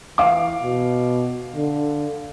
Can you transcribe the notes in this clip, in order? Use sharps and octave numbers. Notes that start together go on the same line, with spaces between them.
E3 F5 D6
B2
D3